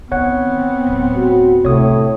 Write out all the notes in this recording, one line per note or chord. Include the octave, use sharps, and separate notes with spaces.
D#3 B3 C4 C#5 F#5
D1
F#4
A2 C3 C#5 D#6